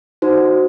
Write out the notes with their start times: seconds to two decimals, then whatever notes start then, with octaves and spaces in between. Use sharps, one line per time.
0.22 D#4 F#4 C5